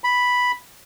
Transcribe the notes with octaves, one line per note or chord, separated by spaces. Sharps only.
B5